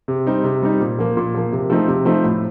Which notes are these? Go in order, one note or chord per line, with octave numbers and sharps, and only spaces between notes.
C3
G3 C4 D#4
C3
G3 C4 D#4
A#2
F3 A#3
A#2
F3 A#3
C3
F3 A3 C4 D#4
C3
F3 A3 C4 D#4
A2